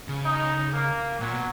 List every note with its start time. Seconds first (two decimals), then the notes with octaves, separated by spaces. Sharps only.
0.08 C#3
0.24 D#4
0.72 A#3
1.20 A#2 F#3
1.33 B2